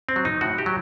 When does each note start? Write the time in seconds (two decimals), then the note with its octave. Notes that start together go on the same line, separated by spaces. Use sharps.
0.09 C4
0.16 F#3
0.25 D#4
0.41 A2 F#4
0.58 G4
0.66 F#3